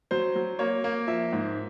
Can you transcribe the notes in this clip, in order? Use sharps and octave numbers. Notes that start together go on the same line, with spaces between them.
F#3 C5
F#3
A#3 C#5
A#3
F3 E5
G#2